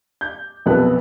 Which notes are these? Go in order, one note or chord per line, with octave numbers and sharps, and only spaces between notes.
G6
B1 F2 C3 B3 F#6